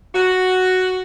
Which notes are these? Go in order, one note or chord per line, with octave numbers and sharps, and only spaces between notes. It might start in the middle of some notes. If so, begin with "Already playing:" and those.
F#4